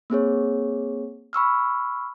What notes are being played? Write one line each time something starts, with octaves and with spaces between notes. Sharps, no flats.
A#3 C4 G#4 C#5
B5 C#6 E6 F6